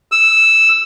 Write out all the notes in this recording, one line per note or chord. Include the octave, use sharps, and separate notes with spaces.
E6